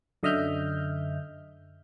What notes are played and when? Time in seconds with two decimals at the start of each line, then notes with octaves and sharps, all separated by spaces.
0.23 F#2 D3 D#5 E5 F6 G6